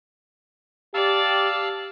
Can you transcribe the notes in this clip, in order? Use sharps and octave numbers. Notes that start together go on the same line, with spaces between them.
G4 D5 F5 A5 E6